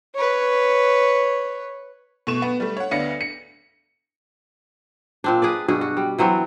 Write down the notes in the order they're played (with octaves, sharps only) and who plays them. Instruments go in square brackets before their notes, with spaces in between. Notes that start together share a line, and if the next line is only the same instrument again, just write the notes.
[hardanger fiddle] B4 C#5
[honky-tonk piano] B2 A3 C#6 E7
B3
G3 A3
C#5 F#5
D2 B3 D4 F5 A#6 C#7
C#7
[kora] A#2 C4 D4
G#4 B4 D5
G2 B2 F#4 G#4
F#4
G3
E3 F#3 B3 C4